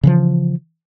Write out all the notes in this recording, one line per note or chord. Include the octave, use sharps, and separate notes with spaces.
C#3 E3 F3